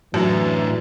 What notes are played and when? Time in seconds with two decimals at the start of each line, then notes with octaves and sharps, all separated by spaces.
0.14 F#2 A2 E3 F#3 D4